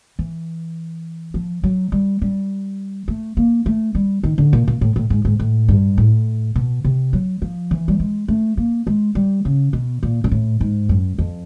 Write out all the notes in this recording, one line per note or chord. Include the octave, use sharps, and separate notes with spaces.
E3
F3
F#3
G3
G3
A3
A#3
A3
G3
D#3
D3
A#2
A#2
A2
A2
G#2
G#2
A2
G2
A2
B2
C3
F#3
F3
E3
G3
G#3
A3
A#3
G#3
G3
C#3
B2
A#2
A#2
A2
G#2
F#2
F2